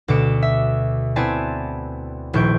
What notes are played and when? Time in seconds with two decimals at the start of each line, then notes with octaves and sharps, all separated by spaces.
0.08 D2 B2 D6 C#7 E7
0.42 E5
1.16 B3 C4 E4 D5 G#5 A5
2.33 D#1 A#1 E4 C#6 G6 D7